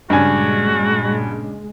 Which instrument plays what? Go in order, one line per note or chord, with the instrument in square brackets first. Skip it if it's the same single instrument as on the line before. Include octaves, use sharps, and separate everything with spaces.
[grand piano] G2 G#5 [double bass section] A#2 G#3 [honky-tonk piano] C#3 D4 [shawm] F#4